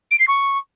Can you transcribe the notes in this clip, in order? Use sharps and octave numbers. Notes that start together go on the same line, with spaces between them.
D7
C7
C#6